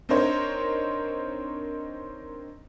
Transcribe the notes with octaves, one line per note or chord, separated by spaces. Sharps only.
C4 D4 D#4 A#4 C5 C#5